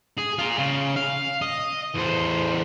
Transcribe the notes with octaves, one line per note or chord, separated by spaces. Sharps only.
G#4
F4 A#4
C#3
F5
D#5
E2 C5